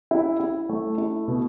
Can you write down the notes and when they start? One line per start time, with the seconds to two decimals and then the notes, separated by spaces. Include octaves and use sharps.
0.11 E4
0.40 E4
0.69 A3
0.98 E4
1.28 B2